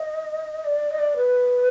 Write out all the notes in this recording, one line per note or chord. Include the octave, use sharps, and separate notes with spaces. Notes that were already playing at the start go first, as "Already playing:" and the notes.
Already playing: D#5
D5
D#5
D5
B4